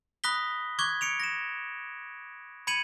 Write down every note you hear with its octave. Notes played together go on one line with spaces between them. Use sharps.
B5 D#6 F#6 A#6 B6 G7
C#6 D6 F#6 G#6 G7
C#7 D7 F7
A#6 E7
B5 G#6 C#7 D#7 F#7